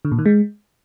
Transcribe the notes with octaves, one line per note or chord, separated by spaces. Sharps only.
D3
A#2
D#3
G#3